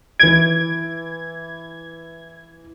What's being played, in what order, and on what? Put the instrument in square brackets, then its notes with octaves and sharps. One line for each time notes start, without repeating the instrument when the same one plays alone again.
[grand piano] E3 D7 [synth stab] G#6